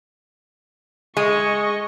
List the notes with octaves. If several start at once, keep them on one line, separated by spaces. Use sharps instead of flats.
G#3 D#5 C#6